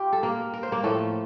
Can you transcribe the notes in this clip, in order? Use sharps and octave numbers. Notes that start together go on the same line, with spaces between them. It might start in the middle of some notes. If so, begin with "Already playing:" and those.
Already playing: F4 G4
A4
A#3 A#4
A#4
C5
A#3 A#4
A2 F3 A3 A#3 A4